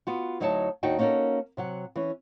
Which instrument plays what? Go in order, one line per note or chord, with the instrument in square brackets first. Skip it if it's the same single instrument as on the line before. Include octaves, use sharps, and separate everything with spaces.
[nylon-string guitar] B3 F4 F#4
D2 F#3 D#4 E4 C#5 A5
D#2 D4 D#4 F#4 G5
A#3 C#4 D#4 F#4 A4 A#4
C3 F#3 F#5
E3 C#4